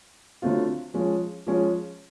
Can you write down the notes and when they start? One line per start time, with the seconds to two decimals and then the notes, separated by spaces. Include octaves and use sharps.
0.42 D3 F#3 A3 C4 F4
0.94 F3 G#3 C#4
1.47 F3 G#3 C#4